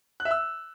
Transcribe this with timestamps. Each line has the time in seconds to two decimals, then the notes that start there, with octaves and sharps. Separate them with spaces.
0.20 F#6
0.25 E5
0.31 E6